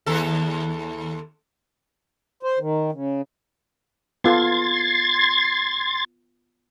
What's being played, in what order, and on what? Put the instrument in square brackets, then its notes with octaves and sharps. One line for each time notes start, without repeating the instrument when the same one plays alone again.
[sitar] D#2 A4
[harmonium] C5
D#3
C#3
[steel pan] B3 F4 A4 [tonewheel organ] C6 G#6 A6